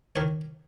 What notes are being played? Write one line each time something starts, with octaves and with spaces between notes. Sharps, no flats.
D#3 C#5